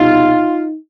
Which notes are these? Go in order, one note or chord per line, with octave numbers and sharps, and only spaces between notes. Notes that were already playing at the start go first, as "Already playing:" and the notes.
Already playing: C2 B2 G3 D#4 F4